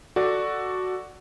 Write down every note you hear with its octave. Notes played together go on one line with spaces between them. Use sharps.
F#4 A4 D5